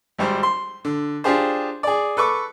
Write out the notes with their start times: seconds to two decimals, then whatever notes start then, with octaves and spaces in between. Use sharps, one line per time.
0.18 G#1 G3 C5
0.43 C6
0.85 D3
1.24 D4 F4 G4 G#4 C5
1.83 G#4 D5
2.17 A4 B4 C#6 D6